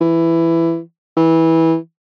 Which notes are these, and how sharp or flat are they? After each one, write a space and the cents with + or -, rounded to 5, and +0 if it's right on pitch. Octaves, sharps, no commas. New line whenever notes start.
E3 +10
E3 -15